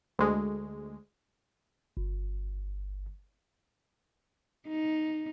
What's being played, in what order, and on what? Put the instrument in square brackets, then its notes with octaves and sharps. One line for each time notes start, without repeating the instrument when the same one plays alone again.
[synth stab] D2 G#3
[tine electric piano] G1
[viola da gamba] D#4